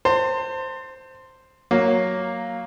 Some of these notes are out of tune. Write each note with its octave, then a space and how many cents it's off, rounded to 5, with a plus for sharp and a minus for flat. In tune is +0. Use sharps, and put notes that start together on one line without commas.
C5 +0 A5 +40
F#3 +0 A#3 +0